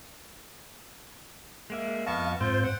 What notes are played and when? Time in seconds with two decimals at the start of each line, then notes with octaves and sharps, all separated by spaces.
1.70 G#3 A#3 E5
2.06 F2 B3 D#5 F5 A5 C#6
2.41 G#2 C4 F4 C5 G6
2.64 F#5